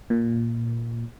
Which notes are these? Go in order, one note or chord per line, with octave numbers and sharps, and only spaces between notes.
A#2